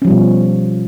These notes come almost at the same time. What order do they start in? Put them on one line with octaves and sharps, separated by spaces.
C#4 F3 G3 B2